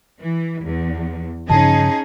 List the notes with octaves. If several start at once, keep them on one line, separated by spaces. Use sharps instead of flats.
E3
E2
G2 C#3 F3 C#4 D#4 G#4 A5